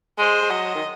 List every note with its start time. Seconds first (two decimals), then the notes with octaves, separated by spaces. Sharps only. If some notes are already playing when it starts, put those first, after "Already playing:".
0.18 G#3 C5
0.42 G#3
0.50 F#3 D#5
0.75 D#3